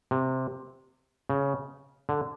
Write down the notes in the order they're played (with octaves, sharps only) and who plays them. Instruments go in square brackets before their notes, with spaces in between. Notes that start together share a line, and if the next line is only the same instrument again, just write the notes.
[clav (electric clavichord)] C3
C#3
D3